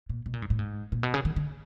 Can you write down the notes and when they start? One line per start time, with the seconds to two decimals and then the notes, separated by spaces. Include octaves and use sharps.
0.09 A#2
0.26 B2
0.33 A#2
0.42 G#2
0.50 A2
0.59 G#2
0.92 A#2
1.03 B2
1.14 C#3
1.25 D#3
1.36 D3